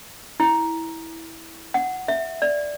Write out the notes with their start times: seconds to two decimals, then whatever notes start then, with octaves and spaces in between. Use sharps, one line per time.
0.40 E4
1.74 F#5
2.08 E5
2.42 D5